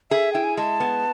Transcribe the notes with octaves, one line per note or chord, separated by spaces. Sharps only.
G#4 E5
E4 G5
G#5
G#3 A5
B3